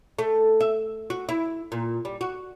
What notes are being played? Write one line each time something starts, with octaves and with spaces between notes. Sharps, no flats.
A3
E5
F#4
E4
A#2
G3
F#4